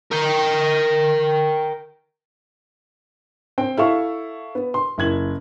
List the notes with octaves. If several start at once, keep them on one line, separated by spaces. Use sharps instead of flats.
A#4 G5
C4 C5 G5
E4 A4 E5 F5 C#6
B3
C6
F#1 E4 G#6 F#7